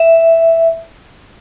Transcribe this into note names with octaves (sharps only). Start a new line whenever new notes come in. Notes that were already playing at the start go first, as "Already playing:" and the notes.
Already playing: E5